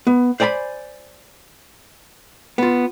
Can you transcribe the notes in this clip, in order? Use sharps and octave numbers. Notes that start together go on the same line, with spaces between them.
B3
C5 D5 G#5 A#5 B5
B3 F4